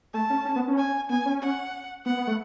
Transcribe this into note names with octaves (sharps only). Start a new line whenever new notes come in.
A3 A5
C#4
C#4
B3
C#4
G#5
B3 G#5
C#4
F#5
B3 F#5
B3
A3